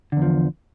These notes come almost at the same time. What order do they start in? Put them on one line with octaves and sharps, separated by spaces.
D3 E2 F3